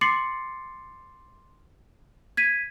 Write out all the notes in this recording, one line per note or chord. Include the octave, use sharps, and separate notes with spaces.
C6 D6 A6 C7 C#7 F#7
G#6 B6 D#7